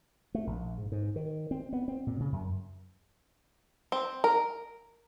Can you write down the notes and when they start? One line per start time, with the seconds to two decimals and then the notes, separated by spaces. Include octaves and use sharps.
0.35 A3
0.47 A#1
0.78 G#2
0.92 G#2
1.16 D#3
1.51 C4
1.73 B3
1.88 C4
2.07 A#2
2.20 C#3
2.32 F#2
3.92 C4
4.24 A#4